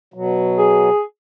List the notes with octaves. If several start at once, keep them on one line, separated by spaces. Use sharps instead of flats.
B2 F#3
G#4